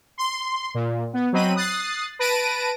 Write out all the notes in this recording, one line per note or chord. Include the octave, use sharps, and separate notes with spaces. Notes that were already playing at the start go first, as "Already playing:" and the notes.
C6
A#2
B3
F#3 C4 D#5 B5 D#7
D#6 F#6 A6 C7
B4 A5 A#6 D7 D#7